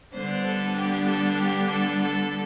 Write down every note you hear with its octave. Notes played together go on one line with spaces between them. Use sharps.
D3 G3 B3 D4 C5
A4
G4
A4
G4
A4
A4